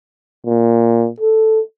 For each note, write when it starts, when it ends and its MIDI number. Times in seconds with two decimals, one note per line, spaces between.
0.46 1.07 46
1.20 1.60 69